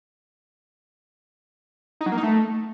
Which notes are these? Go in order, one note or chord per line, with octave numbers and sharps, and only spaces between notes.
D#4
F#3
A#3
D#4
A3